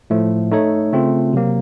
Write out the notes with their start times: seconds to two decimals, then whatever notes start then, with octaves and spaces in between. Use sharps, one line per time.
0.10 A2 F3 A3
0.51 A3 D#4 A4 C#5
0.93 C#3 A3 C4 F4
1.33 C3 F#3 A#3